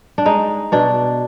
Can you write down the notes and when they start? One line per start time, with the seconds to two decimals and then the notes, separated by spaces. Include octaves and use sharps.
0.18 D4
0.25 G#3 D#4
0.72 B2 D4